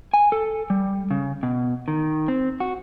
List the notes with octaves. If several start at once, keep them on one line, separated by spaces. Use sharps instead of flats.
G#5
A4
G3
C#3
B2
D#3
C4
F#4